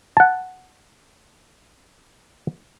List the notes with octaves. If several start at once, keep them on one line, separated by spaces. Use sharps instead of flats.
F#5 A5